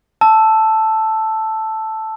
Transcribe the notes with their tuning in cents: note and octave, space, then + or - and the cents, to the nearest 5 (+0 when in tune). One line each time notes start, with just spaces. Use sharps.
A5 +0 E6 +0